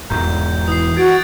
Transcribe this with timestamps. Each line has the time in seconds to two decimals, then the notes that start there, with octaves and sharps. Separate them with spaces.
0.10 E1 E2 G#2 A#5 G6
0.68 E3 D#6 C7
0.97 F#4 G#6 A6 D7